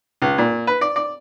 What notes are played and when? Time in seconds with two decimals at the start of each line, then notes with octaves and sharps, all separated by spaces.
0.22 C#2
0.38 A#2
0.67 B4
0.81 D5
0.96 D5